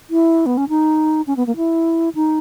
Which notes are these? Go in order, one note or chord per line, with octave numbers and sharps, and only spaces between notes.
E4
B3
C#4
D#4
C#4
B3
A#3
E4
D#4